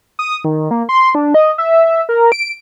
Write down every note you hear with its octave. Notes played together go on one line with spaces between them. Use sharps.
D#6
D#3
A#3
C6
D4
D#5
E5
A#4
D7